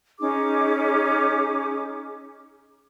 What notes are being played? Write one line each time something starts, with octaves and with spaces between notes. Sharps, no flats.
C#4 D#4 G#4 D6